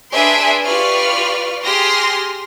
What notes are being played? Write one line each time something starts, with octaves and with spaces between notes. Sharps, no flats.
D4 G#4 B4 E5 C6 D7
F4 G4 B4 D5 C#6 F6
G4 G#4 C6 F6 A#6